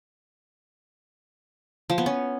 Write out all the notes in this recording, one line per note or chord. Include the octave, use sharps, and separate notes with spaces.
F3
B3
C#4